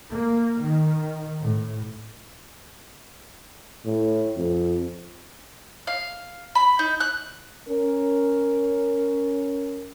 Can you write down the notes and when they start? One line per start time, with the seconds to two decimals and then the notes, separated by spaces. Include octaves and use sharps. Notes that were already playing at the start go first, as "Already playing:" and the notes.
0.11 A#3
0.62 D#3
1.40 A2
3.86 A2
4.36 F2
5.87 F5
6.55 B5
6.79 D#4
7.00 F#6
7.69 C#4 A#4